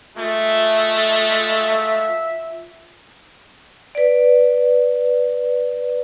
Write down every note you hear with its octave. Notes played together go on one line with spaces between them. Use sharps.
G#3 A3 F4 E5
B4 D5